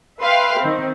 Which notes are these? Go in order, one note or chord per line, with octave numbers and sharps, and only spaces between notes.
B4 E5 F5 G5 B5 C6
D#3 C4